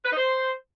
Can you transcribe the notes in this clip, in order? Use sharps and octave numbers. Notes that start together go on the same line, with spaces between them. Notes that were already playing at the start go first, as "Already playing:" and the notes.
B4
D#4
C5